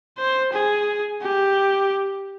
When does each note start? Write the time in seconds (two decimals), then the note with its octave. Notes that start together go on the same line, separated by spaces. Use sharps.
0.18 C5
0.53 G#4
1.22 G4